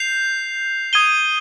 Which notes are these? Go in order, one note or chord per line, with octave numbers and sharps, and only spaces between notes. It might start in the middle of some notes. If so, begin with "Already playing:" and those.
Already playing: G6 C7 F7
D#6 G#6 D#7 G7